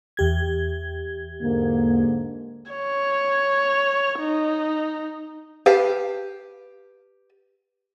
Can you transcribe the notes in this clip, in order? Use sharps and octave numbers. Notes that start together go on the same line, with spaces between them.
E2 G4 G#6
G#2 D3 A#3
C#5
D#4
G4 B4 F5 A5